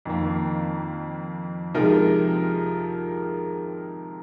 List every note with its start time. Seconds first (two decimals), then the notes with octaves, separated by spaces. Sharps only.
0.06 F2 D#3 A#3
1.74 C3 F3 G#3 D#4 A#4